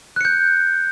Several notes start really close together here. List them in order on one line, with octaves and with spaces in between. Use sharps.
F#6 C#7 G6